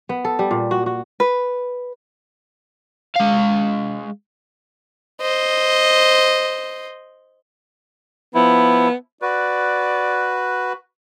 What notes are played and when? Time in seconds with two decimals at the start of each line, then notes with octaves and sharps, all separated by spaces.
0.09 B3
0.25 A4
0.39 G3
0.51 A#2
0.71 F#4
0.86 F#4
1.20 B4
3.16 G#3 F5
5.21 C5 D#5
8.35 F3 B3 E4
9.22 F#4 B4 D5